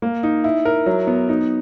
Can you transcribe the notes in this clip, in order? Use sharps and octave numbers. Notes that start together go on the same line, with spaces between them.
A#3
D#4
E4
A#4
F#3
B3
D#4